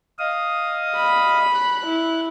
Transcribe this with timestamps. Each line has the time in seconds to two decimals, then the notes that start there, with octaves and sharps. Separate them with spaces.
0.19 D#5 F5 D#6
0.96 B5
1.54 F#6
1.86 E4